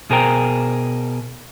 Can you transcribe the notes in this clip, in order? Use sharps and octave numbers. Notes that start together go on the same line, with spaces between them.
B2 G#4 A#4 C5 G5 A#5